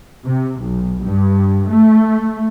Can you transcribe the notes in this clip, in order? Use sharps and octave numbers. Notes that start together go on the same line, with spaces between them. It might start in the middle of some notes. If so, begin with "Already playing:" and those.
C3
B1
G2
A3